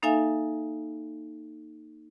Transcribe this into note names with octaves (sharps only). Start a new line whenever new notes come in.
A#3 D#4 A4 E5 F5 G#5